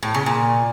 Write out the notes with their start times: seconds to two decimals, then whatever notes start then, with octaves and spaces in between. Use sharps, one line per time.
0.03 A2
0.14 C#3
0.26 A#2